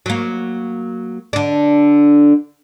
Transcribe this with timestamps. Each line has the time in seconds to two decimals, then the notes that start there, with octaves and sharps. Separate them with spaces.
0.06 F#3 A#3
1.33 D3 D4